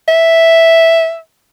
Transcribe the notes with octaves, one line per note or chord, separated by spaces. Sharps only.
E5